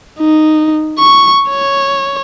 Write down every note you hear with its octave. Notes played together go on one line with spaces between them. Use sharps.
D#4
C#6
C#5